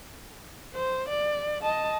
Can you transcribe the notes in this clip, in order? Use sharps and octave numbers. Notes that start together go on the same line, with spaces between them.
C5
D5
D#5 A5